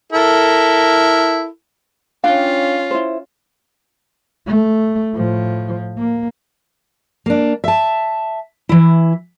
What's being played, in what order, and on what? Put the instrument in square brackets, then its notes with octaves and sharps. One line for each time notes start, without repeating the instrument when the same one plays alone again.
[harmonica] E4 A4 A#4
[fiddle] C#4 F4 [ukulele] D4 F5 G5
[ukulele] E4 C5
[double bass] A3
A2 F3
A#3
[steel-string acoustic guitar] A#3 D4
E5 A5
E3 E4